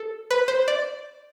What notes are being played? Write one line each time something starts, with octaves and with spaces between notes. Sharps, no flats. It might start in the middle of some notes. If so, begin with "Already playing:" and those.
Already playing: A4
B4
C5
D5